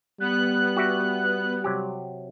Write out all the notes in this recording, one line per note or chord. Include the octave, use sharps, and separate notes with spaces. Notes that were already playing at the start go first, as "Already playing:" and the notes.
G3 B3 F#6
F#4 G4 E5
C3 F#3 G4